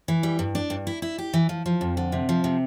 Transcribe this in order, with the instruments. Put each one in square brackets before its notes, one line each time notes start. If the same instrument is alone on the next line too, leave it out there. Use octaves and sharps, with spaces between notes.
[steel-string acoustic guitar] E3
G3
G2
D4
G2
E4
E4
G4
E3
F3
F3
F2
D3
C3
F3
C3